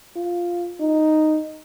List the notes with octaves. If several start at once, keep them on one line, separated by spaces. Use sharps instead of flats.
F4
D#4